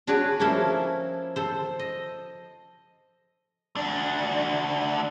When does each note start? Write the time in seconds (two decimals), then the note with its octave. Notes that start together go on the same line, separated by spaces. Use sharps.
0.07 D4 F#4 G#4 B4 C#5 D5
0.40 F3 A#3 C#4 E4 A4
1.36 A4 C5
1.79 D#5
3.76 D2 D4